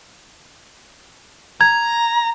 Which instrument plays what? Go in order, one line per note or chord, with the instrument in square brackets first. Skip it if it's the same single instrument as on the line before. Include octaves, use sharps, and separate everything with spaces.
[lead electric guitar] A#5 [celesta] G#6